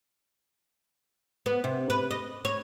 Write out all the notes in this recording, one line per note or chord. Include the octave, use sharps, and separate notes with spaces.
B3
C3
B4
D#5
C#5